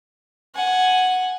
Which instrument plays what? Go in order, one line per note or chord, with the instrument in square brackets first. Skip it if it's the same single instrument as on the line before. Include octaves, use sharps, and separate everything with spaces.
[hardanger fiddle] F#5 G#5